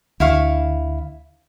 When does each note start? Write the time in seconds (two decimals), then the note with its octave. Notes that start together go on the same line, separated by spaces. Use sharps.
0.20 D2 E4 F5 C#6